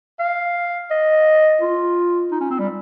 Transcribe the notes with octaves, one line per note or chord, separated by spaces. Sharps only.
F5
D#5
F4
D#4
C#4
C4
G3